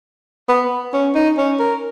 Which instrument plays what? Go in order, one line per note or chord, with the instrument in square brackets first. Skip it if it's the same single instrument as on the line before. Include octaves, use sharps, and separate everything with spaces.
[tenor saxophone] B3
C#4
D#4
C#4
A#4